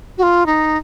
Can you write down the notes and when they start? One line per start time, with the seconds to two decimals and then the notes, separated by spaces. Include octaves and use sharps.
0.18 F#4
0.23 F4
0.46 D#4